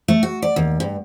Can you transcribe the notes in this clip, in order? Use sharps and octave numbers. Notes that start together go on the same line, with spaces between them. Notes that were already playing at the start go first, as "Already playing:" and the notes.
A3
F#4
D5
D#2
G2